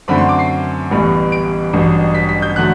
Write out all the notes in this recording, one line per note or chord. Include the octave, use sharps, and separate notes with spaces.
F#2 D3 A3 C4 B5
C6
D6
C7
A1 A2 E3 G3 B3
D7
A1 G2 F#3
B6
B6
G6
D3 F#3 A3 F#6